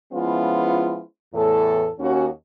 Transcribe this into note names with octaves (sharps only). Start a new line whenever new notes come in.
F3 G#3 B3 C#4 E4 F4
E2 A2 A4
D#2 C#4 F#4